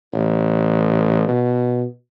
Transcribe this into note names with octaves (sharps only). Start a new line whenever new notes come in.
A1
B2